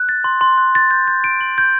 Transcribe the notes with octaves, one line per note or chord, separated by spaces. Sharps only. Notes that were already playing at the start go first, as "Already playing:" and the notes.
Already playing: F#6
A6
C6
C6
F#6
A6
G6
G6
D7
F#7
G6